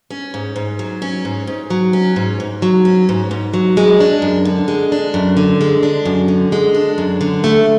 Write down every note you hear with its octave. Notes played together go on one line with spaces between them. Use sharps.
C#4
G#2
G#2
F#3
C#4
G#2
G#2
F#3
C#4
G#2
G#2
F#3
C#4
G#2
G#2
F#3
G#3
D4
F#2
D3
G#3
D4
F#2
D3
G#3
D4
F#2
D3
G#3
D4
F#2
D3
A3